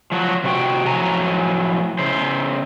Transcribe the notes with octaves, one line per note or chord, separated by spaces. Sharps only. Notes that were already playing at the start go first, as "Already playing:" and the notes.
F3 F#3 F#4
C3 F#4 G5
A2 F3 F#3 G#5 A#5
C#3 E4 C5